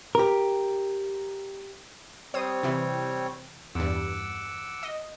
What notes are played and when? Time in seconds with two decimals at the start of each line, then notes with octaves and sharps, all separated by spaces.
0.15 G4 A#4
2.34 G3 C4 C5 C#5 D#6
2.63 C3 E3
3.75 E2 G2 F#5 D6 E6
4.83 D#5